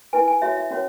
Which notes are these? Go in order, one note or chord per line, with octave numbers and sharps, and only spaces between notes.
E4 B4 G#5
G#5
F#4 C#5 E5
E5
C#4 F#4 C#5